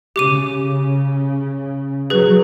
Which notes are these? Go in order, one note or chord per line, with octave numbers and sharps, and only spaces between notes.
C#3 G4 D6 D#7
F#3 G#4 B4